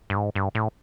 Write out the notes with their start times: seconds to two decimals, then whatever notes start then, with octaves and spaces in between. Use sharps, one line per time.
0.10 G2
0.16 G#2
0.35 G2
0.55 A2